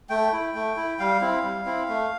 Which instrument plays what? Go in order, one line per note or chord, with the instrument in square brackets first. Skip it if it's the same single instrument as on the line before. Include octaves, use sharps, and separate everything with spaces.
[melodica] A3 G5
E4
A3
E4
G3 F5
C4 E4
G3
C4 E4
A3